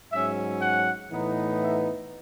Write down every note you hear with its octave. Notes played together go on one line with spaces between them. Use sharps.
G#2 F#3 C#4 E5
F#5
A2 E3 B3 D#4
E5